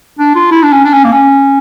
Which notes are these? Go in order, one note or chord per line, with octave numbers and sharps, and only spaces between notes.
D4
F4
E4
D4
C#4
D4
C#4
A#3
C#4